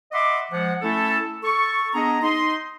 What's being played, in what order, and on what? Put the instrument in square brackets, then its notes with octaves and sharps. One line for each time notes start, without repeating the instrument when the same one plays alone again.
[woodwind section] D#5 E5 F#5 B5 C6 D6
F3 G#3 F#5
A3 C#4 E4 A4
A4 C#6
B3 D4 G#4 D#5 A#5
D#4 D#5 C6